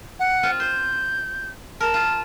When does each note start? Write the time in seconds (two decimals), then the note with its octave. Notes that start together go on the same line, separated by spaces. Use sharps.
0.20 F#5
0.43 C4 F4
0.60 C5 G6
1.80 A#4 A5
1.94 F4